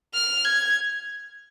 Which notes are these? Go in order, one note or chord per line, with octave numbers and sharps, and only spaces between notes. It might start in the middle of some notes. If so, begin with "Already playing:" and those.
F6
G#6